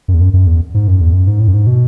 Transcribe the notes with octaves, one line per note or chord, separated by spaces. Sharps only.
F#2
E2
F#2
F#2
E2
G#2
F#2
E2
F#2
G#2
A2
F#2
G#2
B2